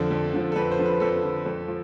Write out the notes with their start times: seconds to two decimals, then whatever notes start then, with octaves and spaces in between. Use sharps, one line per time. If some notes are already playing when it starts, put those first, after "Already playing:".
Already playing: F2 D3 F3 A4
0.11 F2
0.34 D3 F3
0.52 A4
0.56 F2 B4
0.71 C5
0.79 D3 F3
0.86 B4
1.00 F2 A4
1.23 D3 F3
1.46 F2
1.68 F3